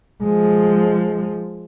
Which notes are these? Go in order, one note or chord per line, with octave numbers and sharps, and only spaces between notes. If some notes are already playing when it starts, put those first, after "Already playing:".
F3 G#3